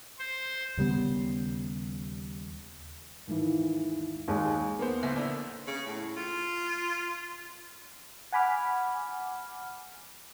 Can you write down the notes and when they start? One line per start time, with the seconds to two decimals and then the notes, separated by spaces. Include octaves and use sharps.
0.19 C5
0.77 D#2 C#3 G3 B3
3.27 D#2 G#2 E3
4.28 D#2 G#3
4.79 A#3 B3 C5
5.02 D2 A2
5.16 D3 E3 D4
5.67 C#3
5.87 A2
6.17 F4
8.32 F#5 G#5 B5 D6 F6